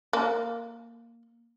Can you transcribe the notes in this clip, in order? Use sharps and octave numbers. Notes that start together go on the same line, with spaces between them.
A#3